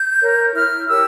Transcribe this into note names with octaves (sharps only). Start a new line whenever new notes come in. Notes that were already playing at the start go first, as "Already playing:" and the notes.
Already playing: G6
A#4 C#5
E4 F6
G4 A#4 C#5 E6